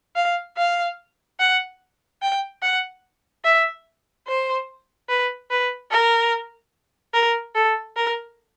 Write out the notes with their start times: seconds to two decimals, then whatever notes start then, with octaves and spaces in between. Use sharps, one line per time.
0.16 F5
0.57 F5
1.39 F#5
2.22 G5
2.62 F#5
3.45 E5
4.27 C5
5.09 B4
5.50 B4
5.91 A#4
7.14 A#4
7.55 A4
7.96 A#4